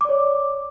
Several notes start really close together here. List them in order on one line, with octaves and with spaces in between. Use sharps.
D6 D5 C#5